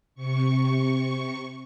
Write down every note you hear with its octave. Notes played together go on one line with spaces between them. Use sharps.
C3 C#6